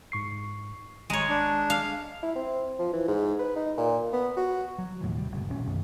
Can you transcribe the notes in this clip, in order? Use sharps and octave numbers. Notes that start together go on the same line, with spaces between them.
G#2 C#6 C7
G#1 G#3 C#5 A#5
D4
F5
E4
C4
F3
E3
G#2
B4
D#4
A#2
B3
F#4
F#3
D#2 A2 E3
C3 G3
F#1 G#2 B2
G#1 A#2 C#4
B1 F#2 D#3 A3